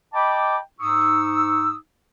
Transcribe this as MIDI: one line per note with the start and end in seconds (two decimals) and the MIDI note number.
0.14 0.58 75
0.14 0.58 79
0.14 0.58 81
0.14 0.58 83
0.14 0.58 86
0.80 1.75 44
0.80 1.75 63
0.80 1.75 85
0.80 1.75 87
0.80 1.75 88